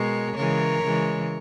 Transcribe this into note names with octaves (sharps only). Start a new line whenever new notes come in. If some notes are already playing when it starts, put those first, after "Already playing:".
Already playing: B2 G#3 A#4 C#5
C#3 E3 G#3 A#4 C#5
C#3 E3 G#3